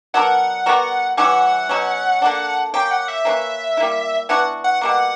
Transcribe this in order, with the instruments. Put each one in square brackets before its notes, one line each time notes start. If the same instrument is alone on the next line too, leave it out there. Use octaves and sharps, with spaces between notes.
[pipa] F#3 B3 D4 A#4 [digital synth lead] F#5
[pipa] G3 B3 F#4 A#4
[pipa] E3 G3 C#4 E4 [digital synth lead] F#5
[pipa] B2 F#3 C#4
D3 A#3 D4
[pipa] A#3 C#4 G4 [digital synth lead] G5
[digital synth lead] F#5
E5
[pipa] A#3 C#4 F#4 B4
G3 A#3 E4
[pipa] E3 B3 D4 F#4 [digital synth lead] F#5
[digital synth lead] F#5
[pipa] B2 G3 A#3